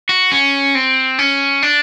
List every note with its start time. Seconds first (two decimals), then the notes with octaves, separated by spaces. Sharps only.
0.09 F#4
0.32 C#4
0.75 C4
1.19 C#4
1.62 D4